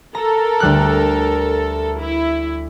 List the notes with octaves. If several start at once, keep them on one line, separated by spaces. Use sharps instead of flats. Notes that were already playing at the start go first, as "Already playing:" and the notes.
A4 A#4 A#5
D2 G3 F#6
E4